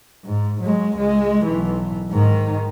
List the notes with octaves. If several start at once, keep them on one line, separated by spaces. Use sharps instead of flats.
G#2
F#3 G#3
C#2 G#3
B1 E3
G#2 D#3